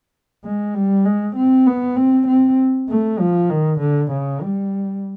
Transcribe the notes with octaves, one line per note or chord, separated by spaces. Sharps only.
G#3
G3
G#3
C4
B3
C4
C4
A3
F3
D#3
D3
C#3
G3